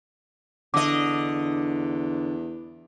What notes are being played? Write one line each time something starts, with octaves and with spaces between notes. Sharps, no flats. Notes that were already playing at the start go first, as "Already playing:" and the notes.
E2 D3 D#5 D6